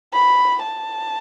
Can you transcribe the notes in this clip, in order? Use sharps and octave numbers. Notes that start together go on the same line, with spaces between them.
B5
A5